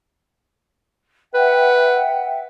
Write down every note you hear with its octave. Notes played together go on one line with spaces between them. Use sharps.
B4 E5 F#5 G5